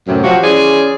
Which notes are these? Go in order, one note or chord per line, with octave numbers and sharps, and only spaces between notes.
F#2 A2 C3 F#3
F3 F#3 F#4 G4 C5
E3 C#4 G#4 C5 D5